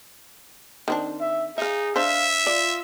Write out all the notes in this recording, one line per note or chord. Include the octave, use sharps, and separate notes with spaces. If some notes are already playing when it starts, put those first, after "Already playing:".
D#3 C4 D4
E5
D#4 G#4 E5 F5
D4 C5 E5 F5
F4 D5